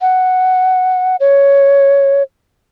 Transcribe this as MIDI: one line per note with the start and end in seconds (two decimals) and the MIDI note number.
0.01 1.16 78
1.20 2.23 73